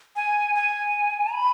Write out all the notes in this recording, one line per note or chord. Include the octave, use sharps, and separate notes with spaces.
G#5
G#5
B5